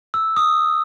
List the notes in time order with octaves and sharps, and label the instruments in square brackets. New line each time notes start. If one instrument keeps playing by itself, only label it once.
[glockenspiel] E6
D#6 E6